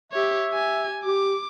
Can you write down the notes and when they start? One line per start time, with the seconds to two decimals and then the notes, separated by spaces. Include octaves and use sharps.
0.12 G4 C#5 E5
0.50 G4 G#5
1.05 G4 D6